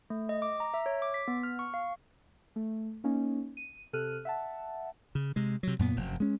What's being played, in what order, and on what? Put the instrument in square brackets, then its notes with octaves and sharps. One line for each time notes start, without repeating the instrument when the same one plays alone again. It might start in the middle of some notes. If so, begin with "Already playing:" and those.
[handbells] A3
D#5
D6
A#5
E5
C#5
D6
B6
B3
F6
C#6
F5
[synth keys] A3
A#3 C#4 D#4
D#7
C3 A4 F6 F#6 D#7
E5 F#5 A5
[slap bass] C#3
C3 G#3
C3 F#3
F#2 A#2 B3
F1 F#2
G#3 C#4